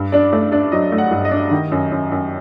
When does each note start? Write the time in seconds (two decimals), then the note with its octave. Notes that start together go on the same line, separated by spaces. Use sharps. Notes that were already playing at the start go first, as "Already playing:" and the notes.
Already playing: G2
0.12 D4 D5
0.33 A3 D5
0.52 D4 D5
0.72 F#3 D#5
0.92 A3
0.98 F#5
1.11 G2
1.25 D#5
1.31 D4
1.51 D#3
1.72 F#2
1.92 F#2
2.12 F#2